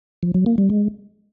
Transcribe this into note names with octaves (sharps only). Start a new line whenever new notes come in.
F3
F#3
A#3
G3
G#3